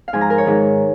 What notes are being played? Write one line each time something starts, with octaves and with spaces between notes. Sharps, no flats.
F5
G#2 F3 G#5
A#5
A#4
C#5
G#2 D#3